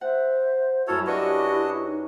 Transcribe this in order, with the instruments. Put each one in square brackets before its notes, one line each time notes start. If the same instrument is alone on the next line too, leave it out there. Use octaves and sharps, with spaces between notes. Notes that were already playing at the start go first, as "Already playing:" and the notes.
[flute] C5 [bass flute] E5 [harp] F#5
[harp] F#2 F6 [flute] E4 [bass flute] F#4 [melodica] A4 C#5
[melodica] D4 F#4 D#5 [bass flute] G4 [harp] B4 C#5 E5
[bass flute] D#4